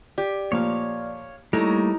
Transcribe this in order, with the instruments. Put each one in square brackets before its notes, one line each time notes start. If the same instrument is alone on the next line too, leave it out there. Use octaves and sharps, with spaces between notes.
[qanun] G4 [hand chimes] D5
[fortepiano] A#2 F3 A#3 [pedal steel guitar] C#5 F5
[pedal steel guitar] G3 A3 A#3 [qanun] D#4 C#5 A#5 [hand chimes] E4 [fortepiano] A4